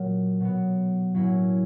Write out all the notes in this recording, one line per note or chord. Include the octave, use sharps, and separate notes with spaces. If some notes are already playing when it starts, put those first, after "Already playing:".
Already playing: A#2 F#3 A#3
B2 F#3 B3
A2 F#3 A#3 C#4 E4